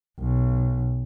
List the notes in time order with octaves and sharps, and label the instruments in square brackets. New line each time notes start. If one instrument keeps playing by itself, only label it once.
[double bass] B1